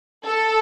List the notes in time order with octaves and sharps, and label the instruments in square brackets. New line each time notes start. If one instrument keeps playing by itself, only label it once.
[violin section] A4